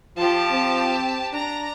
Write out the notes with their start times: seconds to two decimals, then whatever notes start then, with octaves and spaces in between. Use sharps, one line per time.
0.17 F3 G4 A5
0.50 C4
1.33 D4 A#5